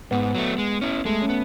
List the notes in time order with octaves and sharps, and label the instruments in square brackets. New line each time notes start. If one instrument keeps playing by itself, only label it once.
[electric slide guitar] G#2 [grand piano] B3
[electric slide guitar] F#3 A3
G#3
C#4 E4
[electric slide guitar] G#3 [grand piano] A3
[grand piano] C#4
[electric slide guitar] B3